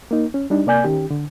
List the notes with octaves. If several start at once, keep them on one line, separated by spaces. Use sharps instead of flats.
A#3 D#4
C#4
G3 D4 D#4
C3 A#3 D5 G#5 G6
D#3 C#4 G4
D3